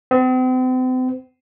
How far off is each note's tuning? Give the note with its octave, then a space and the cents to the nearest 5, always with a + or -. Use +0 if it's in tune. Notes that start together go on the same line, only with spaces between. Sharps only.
C4 -40